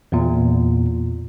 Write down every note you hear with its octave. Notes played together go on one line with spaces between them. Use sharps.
E2 A#2